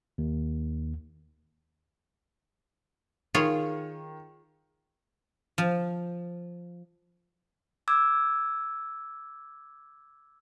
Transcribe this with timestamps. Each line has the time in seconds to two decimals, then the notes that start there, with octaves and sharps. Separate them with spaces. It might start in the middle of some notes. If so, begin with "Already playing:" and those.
0.18 D#2
3.35 D#3 F4 G#4 C#5
5.58 F3
7.88 D6 E6 G#6